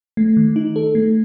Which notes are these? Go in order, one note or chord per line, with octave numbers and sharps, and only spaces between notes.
A3
D#3
D#4
A4
A3